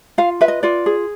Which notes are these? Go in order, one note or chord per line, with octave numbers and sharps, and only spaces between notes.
F4 F5
B4 E5
D#5
F4 D5
G#4